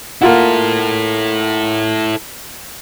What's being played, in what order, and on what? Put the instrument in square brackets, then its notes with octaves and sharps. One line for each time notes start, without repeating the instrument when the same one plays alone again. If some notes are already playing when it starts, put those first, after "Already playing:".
[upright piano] A#3 F4 F#5 [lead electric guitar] E4 A4